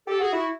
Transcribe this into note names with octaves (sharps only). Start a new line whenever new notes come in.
G4 A4
F#4 G#4
E4 F#4